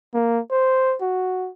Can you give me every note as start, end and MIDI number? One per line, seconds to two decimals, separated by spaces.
0.14 0.39 58
0.51 0.96 72
1.01 1.49 66